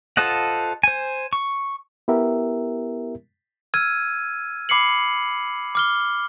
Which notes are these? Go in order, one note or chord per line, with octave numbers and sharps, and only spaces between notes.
F4 A4 C5 D#5 F#5
C5 G#5
C#6
B3 E4 G4 A#4 E5
E6 F6 G#6 D#7
B5 D6 C7 C#7 F#7
D6 F6 G7